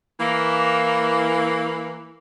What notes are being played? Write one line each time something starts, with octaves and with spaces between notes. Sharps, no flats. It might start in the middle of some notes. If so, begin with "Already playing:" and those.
E3 A#3